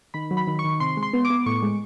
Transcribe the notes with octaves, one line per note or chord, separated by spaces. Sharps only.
D#3 B5
F#3
B5
D#3
C#6
D#3
C3 C6
G#3
C6
B3
D6
B3
A2 C#6
G#3